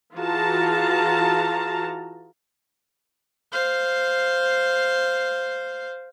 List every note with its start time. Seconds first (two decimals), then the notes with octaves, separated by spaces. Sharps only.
0.15 E3 F4 F#4 G#4 A5 A#5
3.52 C5 F5